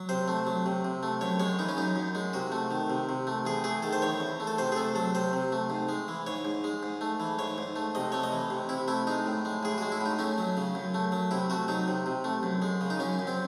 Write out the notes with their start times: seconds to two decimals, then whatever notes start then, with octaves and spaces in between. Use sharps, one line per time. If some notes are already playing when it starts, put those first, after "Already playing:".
Already playing: F#3
0.09 C3 C5
0.28 A3
0.47 F#3
0.66 C3
0.85 C3
1.03 A3
1.21 F#2 C#5
1.40 G#3 C#5
1.59 E3 D#4
1.69 C#4
1.77 F#2 D#4
1.96 F#2
2.15 G#3
2.33 C3 F#4
2.52 A3
2.71 D#3
2.90 C3
3.09 C3
3.27 A3
3.45 E2 G#4
3.64 A3 G#4
3.82 D#3 A4
3.93 C5
4.02 E2 C#5
4.20 E2
4.40 A3
4.47 A4
4.58 C3 C5
4.72 G#4
4.76 A3 A4
4.95 F#3 A4
5.15 C3 C5
5.33 C3
5.52 A3
5.70 G#2
5.89 G#3
6.08 E3
6.27 G#2 C#5
6.45 G#2
6.64 G#3
6.83 G#2
7.01 A3
7.20 E3
7.39 G#2 C#5
7.58 G#2
7.76 A3
7.95 C3 D#5
8.12 A3 C#5
8.23 D#5
8.32 E3
8.50 C3
8.69 C3 E4
8.88 A3 E4
9.07 G#3 D#4
9.26 A2
9.45 G#3
9.63 A2 G#4
9.78 G#3 F#4
9.92 E4
10.01 A2
10.06 D#4
10.19 A3 C#4
10.38 F#3
10.57 C#3
10.75 F#2
10.94 A3
11.12 F#3
11.31 C3 E4
11.50 A3 F#4
11.68 F#3 D#4
11.88 C3
12.06 C3
12.24 A3
12.43 F#2
12.62 G#3
12.81 C#3
12.90 D#4
12.99 F#2 C#4
13.19 F#2
13.27 C4